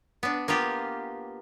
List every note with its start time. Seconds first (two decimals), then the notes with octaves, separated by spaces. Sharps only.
0.23 B3 D4
0.48 A#3 B3 F4 G4